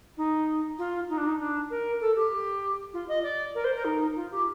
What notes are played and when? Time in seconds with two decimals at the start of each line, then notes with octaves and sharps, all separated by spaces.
0.17 D#4
0.78 F4
1.09 D#4
1.17 D4
1.26 D#4
1.39 D4
1.70 A#4
2.00 A4
2.15 G4
2.93 F4
3.08 D#5
3.23 D5
3.54 A#4
3.64 C5
3.75 A#4
3.84 D#4
4.16 F4
4.31 G4